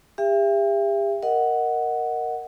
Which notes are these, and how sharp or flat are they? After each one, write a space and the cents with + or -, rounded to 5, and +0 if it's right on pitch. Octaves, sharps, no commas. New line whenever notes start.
G4 +40 E5 +35 G5 +30
A#4 +0 D#5 +0 F#5 +0